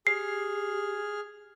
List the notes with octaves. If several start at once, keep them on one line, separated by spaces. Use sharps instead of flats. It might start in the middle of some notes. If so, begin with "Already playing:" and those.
G4 G#4 F6 C7